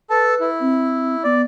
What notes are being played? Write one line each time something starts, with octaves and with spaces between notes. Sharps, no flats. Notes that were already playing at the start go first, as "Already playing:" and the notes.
A4 B4 A5
E4
C4
B3 D5